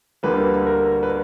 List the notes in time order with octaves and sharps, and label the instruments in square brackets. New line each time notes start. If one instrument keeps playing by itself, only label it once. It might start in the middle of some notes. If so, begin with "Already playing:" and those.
[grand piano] D2 D3 G3 A#3 B4
A#4
B4